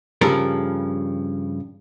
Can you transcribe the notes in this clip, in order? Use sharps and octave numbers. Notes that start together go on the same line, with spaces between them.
G2 C#3 F3 A4 A#4